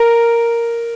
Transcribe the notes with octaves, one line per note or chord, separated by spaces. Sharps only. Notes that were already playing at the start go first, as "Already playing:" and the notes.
Already playing: A#4